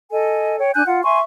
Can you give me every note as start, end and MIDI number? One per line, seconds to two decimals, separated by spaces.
0.11 0.59 69
0.11 0.59 75
0.11 0.59 80
0.59 0.71 73
0.59 0.71 79
0.75 0.82 62
0.75 0.82 80
0.75 0.82 90
0.75 0.82 91
0.87 1.02 65
0.87 1.02 78
1.03 1.20 76
1.03 1.20 80
1.03 1.20 84
1.03 1.20 85